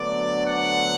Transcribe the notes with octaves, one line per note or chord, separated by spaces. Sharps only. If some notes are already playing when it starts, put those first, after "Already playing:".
Already playing: D2 D3 F#3 B3 D5
F#5